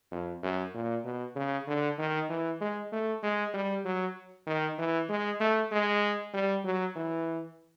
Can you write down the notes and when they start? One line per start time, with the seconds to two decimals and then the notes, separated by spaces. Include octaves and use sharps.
0.12 F2
0.43 F#2
0.75 A#2
1.05 B2
1.36 C#3
1.68 D3
1.99 D#3
2.30 E3
2.61 G#3
2.92 A3
3.23 G#3
3.54 G3
3.85 F#3
4.47 D#3
4.79 E3
5.10 G#3
5.41 A3
5.72 G#3
6.34 G3
6.65 F#3
6.96 E3